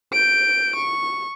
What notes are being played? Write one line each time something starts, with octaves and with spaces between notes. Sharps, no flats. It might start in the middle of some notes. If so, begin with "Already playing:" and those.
G6 D7
C#6